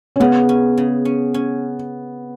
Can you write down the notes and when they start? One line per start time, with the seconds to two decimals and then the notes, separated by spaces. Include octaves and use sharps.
0.16 C#4
0.20 C#3 B3
0.49 C#4
0.78 C#3
1.05 C#4
1.34 C#4